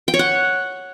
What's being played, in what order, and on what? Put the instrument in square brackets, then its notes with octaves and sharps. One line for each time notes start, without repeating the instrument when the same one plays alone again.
[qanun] G5
C#5
F#5